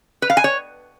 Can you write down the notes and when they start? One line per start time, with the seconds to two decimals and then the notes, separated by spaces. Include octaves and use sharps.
0.22 B4
0.30 F5
0.37 G#5
0.44 C#5